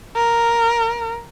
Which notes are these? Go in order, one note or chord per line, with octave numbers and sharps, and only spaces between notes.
A#4